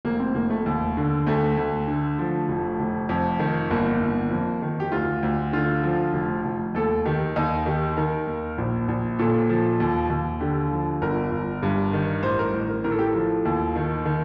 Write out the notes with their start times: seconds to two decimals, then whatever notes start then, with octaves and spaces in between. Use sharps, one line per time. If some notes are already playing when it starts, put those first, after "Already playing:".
0.05 F1 A#3
0.20 C4
0.35 F1 A#3
0.50 A3
0.66 D#2
0.97 D3
1.27 D2 A3
1.58 D2
1.88 D3
2.19 F3
2.49 F1
2.80 F1
3.09 F2
3.39 D#3
3.70 G1 A#3
4.00 G1
4.31 F2
4.62 D#3
4.80 G4
4.92 D2 F4
5.23 D2
5.53 D3 F4
5.83 F3
6.14 F1
6.45 F1
6.74 D#2 A4
7.05 D#3 G4
7.36 D#2 D#4
7.66 D#3 G4
7.97 D#3 A#4
8.27 D#2
8.58 A#1
8.88 A#1
9.19 A#2 A4
9.49 F3
9.80 D#2
10.10 D#2
10.40 D3 G4
10.71 F3
11.02 G1 A#4
11.31 G1
11.63 G2
11.93 D#3
12.23 A1 C5
12.39 A#4
12.53 A1
12.69 A#4
12.84 A2 A#4
12.91 A4
12.99 G4
13.06 A4
13.14 F3
13.45 D#2
13.76 D#3
14.05 D#3